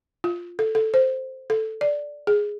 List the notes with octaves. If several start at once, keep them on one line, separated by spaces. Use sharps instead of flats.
F4
A4
A4
C5
A4
D5
G#4